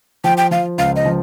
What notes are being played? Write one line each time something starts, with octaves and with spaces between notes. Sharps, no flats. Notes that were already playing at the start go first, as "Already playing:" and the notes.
F3 G5
G5
F3 F5
C#2 F5
D#5
F3